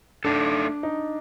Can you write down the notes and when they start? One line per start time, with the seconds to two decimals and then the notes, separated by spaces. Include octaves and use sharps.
0.25 A3 D4 D#4 A4
0.83 D#4